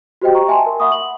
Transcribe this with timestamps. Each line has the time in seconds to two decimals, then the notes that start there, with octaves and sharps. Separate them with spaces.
0.22 F#4 G4 C5 D#5 G5
0.34 G5 A#5 C#6
0.48 E5 G#5 A5 C6
0.66 A#4
0.80 E5 F#5 B5 C#6 D#6
0.92 F#7